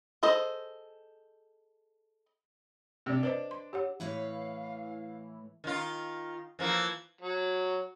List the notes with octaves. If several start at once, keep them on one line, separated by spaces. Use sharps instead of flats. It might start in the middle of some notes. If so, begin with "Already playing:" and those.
G#4 A4 C5 D#5
C3 D4
D4 B4 C5 D#5
C6
G4 C#5 F#5
A2 E3 E4 B4 C#5 F5
D#3 F4
E3 F3 A#3
F#3